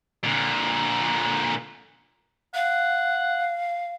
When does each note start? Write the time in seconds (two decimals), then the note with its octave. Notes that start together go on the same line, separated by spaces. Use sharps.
0.24 A#2 D3
2.55 F5 F#5